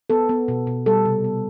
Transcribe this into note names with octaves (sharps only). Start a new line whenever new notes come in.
B3 A4
B3
B2
B2
G3 A4
C3
B3